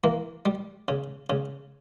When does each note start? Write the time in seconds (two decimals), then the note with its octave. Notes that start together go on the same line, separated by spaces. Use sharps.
0.04 E3 A#3
0.46 G3
0.88 C#3
1.30 C#3